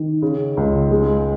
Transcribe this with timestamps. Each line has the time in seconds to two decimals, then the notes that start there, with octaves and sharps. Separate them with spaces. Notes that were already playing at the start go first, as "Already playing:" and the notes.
Already playing: D#3
0.22 C#3
0.57 C#2
0.91 G#3